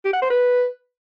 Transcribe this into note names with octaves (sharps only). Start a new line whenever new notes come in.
G4
F#5
C5
B4